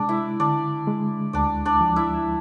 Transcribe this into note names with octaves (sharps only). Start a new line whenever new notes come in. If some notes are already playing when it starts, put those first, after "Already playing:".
Already playing: C3 G#3 D4 D5
E4 E5
D3 D4 D5
G#3
D2 D4 D5
D4 D5
F3
E4 E5